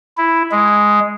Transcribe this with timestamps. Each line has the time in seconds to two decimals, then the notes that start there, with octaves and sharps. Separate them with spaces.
0.18 E4
0.51 G#3